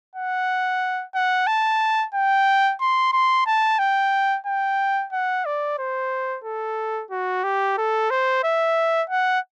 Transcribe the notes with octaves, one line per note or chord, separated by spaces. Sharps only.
F#5
F#5
A5
G5
C6
C6
A5
G5
G5
F#5
D5
C5
A4
F#4
G4
A4
C5
E5
F#5